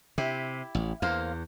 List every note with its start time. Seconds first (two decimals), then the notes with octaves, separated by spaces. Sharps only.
0.18 C3 E4 G4
0.75 A1
1.02 E2 A#3 C5 F5